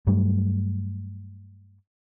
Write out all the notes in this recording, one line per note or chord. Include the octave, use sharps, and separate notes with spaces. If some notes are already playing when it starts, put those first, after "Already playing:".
G2 F#3 G3 A3